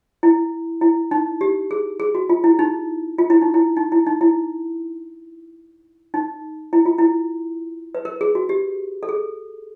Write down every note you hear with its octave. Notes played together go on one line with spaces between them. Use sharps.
E4
E4
D#4
G4
G#4
G#4
F#4
F4
E4
D#4
F4
E4
D#4
E4
D#4
E4
D#4
E4
D#4
E4
F4
E4
B4
A#4
G#4
F#4
G4
A4
G#4